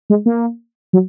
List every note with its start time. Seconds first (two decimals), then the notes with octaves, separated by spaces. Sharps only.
0.10 G#3
0.26 A#3
0.93 F#3